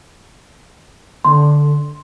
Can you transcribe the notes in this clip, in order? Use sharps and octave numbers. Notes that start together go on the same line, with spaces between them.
D3 C6